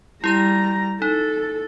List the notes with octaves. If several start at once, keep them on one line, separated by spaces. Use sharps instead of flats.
G3 E4 G4 A#5 G6
D#4 A4